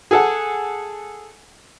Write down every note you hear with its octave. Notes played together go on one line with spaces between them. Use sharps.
G#4 A4 F#5